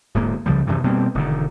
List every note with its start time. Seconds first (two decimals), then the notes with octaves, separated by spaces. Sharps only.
0.15 D1 G#2 A#3
0.46 C#2 C#3 F3 G3
0.67 F#2 C3 D#3 E3
0.84 B2 G3 A#3 C4
1.15 E1 D3 D#3